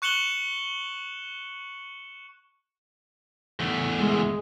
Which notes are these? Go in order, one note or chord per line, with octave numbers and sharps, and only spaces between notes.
C#6 F#6 C#7 E7 F#7 G7
E2 A3
G#3